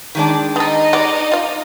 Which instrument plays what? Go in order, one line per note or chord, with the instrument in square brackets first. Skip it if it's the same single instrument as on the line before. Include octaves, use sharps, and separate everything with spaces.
[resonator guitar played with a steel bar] D#3 G#3 D4
[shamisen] B3 A4 [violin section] D#4 D#5
[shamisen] G3 G#3 B3 [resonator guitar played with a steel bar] D5
[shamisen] F4 F5